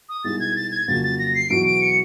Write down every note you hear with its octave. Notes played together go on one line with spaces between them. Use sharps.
D#6
C2 B2 G#3 B3 D#4 A6
G#6
A6
G#6
F2 C#3 F#3 A#3 A6
A6
A#6
C7
E2 B2 F#3 D7
D7
C#7